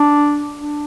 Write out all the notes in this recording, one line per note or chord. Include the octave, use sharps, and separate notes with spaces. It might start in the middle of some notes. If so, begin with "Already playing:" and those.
Already playing: D4
D4